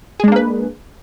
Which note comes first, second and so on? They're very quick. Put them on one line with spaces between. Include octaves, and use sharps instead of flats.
G#4 G#3 D4 A#3 B4